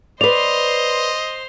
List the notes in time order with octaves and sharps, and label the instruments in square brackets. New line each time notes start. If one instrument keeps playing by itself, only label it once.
[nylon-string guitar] B4 D5 [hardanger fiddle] C5 C6 [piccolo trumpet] D#5 [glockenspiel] F7